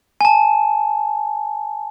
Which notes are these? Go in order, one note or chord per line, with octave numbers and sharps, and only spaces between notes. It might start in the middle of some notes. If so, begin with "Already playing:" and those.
G#5 A5